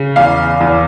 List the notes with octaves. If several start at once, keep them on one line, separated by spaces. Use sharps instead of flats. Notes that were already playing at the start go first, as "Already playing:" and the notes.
Already playing: C#3
E2 F5
E2